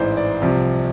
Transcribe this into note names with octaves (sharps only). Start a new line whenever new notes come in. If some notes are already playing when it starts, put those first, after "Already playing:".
Already playing: A1 G#2 E3 C5 D5
D5
C2 C3 F3